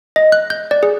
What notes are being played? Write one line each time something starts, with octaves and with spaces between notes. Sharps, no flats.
D#5
F#6
G6
D5
G#4